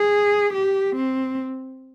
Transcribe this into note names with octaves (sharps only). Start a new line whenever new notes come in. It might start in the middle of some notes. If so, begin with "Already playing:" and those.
Already playing: G#4
G4
C4